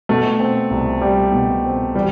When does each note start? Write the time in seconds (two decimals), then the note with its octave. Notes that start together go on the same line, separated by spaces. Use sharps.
0.09 B2 A3
0.40 C4
0.70 C2
1.01 G3
1.32 B2
1.64 C4
1.95 E3 G3